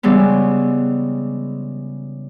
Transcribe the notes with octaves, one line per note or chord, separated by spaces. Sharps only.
C#3 E3 G3 G#3 B3